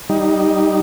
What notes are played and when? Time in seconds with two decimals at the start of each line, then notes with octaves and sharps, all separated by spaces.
0.09 G3 D#4